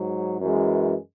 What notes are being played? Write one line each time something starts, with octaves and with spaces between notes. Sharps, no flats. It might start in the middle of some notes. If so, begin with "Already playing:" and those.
Already playing: G#2 F#3
F#2 E3 G#3